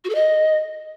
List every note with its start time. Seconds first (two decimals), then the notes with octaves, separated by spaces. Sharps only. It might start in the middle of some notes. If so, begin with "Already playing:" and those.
0.04 F#4
0.10 A4
0.15 D#5